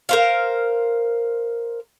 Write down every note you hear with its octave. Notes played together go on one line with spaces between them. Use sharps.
A#4 C5 F5